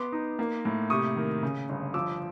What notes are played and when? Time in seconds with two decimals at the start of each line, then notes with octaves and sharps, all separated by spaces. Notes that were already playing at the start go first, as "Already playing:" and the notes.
Already playing: B3 C6 D6
0.12 D#4
0.39 A#3
0.65 A2
0.90 C3 C#6 D#6
1.16 D#3
1.43 C#3
1.69 G1
1.94 F3 D6 E6